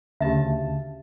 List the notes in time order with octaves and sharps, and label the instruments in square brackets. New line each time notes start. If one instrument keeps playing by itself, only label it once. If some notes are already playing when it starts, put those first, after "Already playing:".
[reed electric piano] D2 C#3 A5 [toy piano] G4 E5